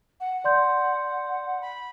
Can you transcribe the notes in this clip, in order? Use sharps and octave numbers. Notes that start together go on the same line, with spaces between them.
F#5
D5 C6 G6
B5